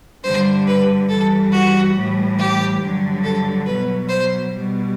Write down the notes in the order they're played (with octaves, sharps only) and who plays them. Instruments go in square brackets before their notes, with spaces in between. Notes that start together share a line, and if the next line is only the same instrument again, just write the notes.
[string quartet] G2 D3 G3 C5
B4
G2 E3 G3 A4
F#4
A2 E3 G3
G4
G2 D3 F#3
A4
B2 F#3 B4
C5
B2 G3